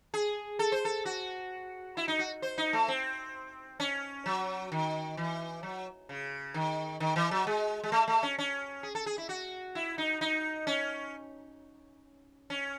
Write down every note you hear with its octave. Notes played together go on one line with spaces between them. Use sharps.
G#4
A4
C5
A4
F#4
E4
D#4
F#4
C5
D#4
A3
C4
C#4
F#3
D#3
E3
F#3
C#3
D#3
D#3
E3
F#3
G#3
G#3
A3
A3
C#4
C#4
G#4
A4
G#4
E4
F#4
E4
D#4
D#4
C#4
C#4